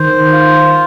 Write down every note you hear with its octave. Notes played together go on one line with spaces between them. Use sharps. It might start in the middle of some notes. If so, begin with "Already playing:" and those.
Already playing: D#3 C5
F4